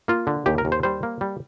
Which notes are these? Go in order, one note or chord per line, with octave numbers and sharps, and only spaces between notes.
A#3 F4
D3
D#2 G4
A#4
D#2
C5
G3 C5
A#3
G3